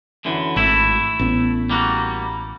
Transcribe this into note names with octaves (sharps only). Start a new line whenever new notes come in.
F#2 D3 E3
G#1 A3 E4
A1 B3
G3 A#3 F#4